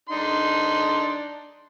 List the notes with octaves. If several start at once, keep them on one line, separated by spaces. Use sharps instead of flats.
D4 D#4 C6